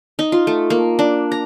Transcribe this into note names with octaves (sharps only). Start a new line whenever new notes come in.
D#4
F4
A3
A#3
D4
A#5